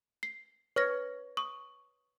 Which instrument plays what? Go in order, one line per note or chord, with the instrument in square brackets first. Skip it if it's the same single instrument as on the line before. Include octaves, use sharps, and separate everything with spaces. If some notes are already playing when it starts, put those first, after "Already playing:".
[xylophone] C7
[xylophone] B4 F6 A#6 [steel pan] C#5
[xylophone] C#6 D#6